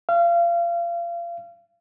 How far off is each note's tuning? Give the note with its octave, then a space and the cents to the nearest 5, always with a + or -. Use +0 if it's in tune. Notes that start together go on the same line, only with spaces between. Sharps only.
F5 -30